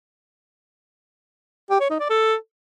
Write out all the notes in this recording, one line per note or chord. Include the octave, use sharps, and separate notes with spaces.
G4
C#5
D#4
D5
A4